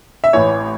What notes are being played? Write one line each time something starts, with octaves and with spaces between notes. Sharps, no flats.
E5
A1 A2 E3 C#5